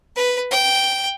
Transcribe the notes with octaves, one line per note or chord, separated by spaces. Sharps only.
B4
G5